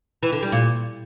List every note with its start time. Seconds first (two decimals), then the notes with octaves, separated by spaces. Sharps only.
0.23 E3
0.32 D3
0.42 G3
0.52 A#2